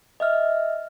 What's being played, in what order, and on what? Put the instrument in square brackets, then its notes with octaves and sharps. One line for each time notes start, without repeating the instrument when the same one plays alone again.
[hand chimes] D#5 E5 F6